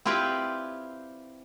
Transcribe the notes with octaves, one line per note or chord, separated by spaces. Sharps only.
C4 E4 F4 G4 B4 D5